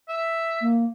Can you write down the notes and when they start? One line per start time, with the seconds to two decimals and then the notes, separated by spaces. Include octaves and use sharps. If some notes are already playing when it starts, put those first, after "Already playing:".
0.08 E5
0.61 A#3